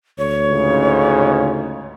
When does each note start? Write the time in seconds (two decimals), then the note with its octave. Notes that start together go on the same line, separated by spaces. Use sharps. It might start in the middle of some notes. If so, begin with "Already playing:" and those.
0.18 D2 C#5
0.50 C#2 G#2 C#3